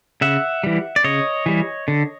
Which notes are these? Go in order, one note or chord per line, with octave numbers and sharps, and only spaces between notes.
C#3 E5 F#5
E3 G3
D5
C#3 C#5 D#5
E3 G3
D3